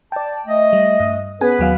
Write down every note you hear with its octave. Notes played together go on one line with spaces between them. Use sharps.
D5 G5 A5
A3 D#5
G3
G2
B3 C#4 G#4 B4 G#5
D#2 F#3 F5